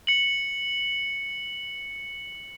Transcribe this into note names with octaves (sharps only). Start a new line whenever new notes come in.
C#7 F#7